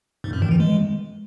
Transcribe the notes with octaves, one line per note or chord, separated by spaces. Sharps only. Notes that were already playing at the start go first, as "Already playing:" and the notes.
G#2
F#2
D#3
E3
G#3